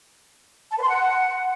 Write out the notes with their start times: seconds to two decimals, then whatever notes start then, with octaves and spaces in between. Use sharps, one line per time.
0.71 A5
0.76 B4
0.82 C6
0.88 F#5